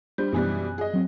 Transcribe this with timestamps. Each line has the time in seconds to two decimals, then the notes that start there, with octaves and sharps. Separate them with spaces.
0.18 G3 D4 C5 G6
0.32 F#2 B2 E3 G3 F#6
0.78 G#4 D#5
0.93 F#3 C4